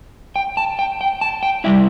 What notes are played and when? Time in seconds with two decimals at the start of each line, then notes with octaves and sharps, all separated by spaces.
0.36 G5
0.57 A5
0.79 G5
1.01 G5
1.21 A5
1.43 G5
1.64 C3 G3 E4 E5